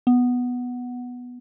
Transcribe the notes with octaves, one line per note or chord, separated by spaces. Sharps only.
B3